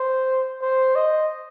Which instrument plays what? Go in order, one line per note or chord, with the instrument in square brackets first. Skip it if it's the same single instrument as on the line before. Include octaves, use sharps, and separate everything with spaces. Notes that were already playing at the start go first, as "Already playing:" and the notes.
Already playing: [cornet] C5
C5
D#5